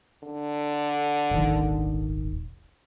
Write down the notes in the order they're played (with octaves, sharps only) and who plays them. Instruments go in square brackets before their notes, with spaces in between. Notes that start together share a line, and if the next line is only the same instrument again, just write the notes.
[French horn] D3
[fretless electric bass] D#1 G#1 D#3